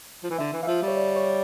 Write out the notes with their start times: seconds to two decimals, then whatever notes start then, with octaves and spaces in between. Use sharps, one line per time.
0.23 F3
0.30 E3
0.38 D3 E5
0.53 E3
0.63 E3 F5
0.67 F3 E5
0.82 G3
0.88 C#5
0.97 D5
1.16 C#5